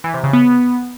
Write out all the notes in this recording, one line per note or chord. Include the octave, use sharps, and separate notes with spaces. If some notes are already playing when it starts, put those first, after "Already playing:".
E3
C3
C#3
B3